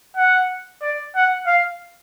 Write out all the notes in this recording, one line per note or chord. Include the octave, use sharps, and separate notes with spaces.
F#5
D5
F#5
F5